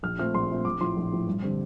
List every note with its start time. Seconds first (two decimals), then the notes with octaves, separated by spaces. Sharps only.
0.03 A#1 F6
0.18 A#2 A3 C4 F6
0.34 A#1 C6
0.50 A#2 A3 C4
0.65 A#1 D6
0.81 A2 F3 C6
0.97 A#1
1.12 A2 F3
1.27 G2
1.42 D3 G3 C4